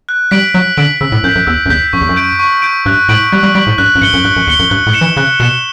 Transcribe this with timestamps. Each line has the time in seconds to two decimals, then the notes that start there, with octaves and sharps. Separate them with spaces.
0.09 F#6
0.31 G3 B6 D7 F#7
0.54 F#3 F#6
0.77 D3 B6 D7 F#7
1.01 C#3 E6
1.12 A2
1.24 F#2 G6 B6
1.35 F#2
1.47 E2 E6
1.66 F#2
1.70 E2 G6 B6
1.93 F#2 C#6
2.01 E2
2.09 F#2
2.16 G6 D7
2.39 C#6
2.62 G6 D7
2.86 G2 F#6
3.09 A2 B6 D7 F#7
3.32 G3 F#6
3.43 G3
3.55 G3 B6 D7 F#7
3.67 A2
3.78 G2 F#6
3.95 F#2
4.02 G2 C#7 G7
4.14 F#2
4.24 G2 F#6
4.36 F#2
4.47 E2 C#7 G7
4.59 F#2
4.70 G2 F#6
4.86 A2
4.93 C#7 E7 G7
5.01 E3
5.17 C#3 F#6
5.40 B2 C#7 E7 G7